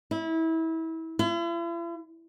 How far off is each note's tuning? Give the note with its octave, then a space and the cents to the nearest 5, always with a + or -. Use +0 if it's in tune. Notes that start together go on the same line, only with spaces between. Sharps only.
E4 -25
E4 +45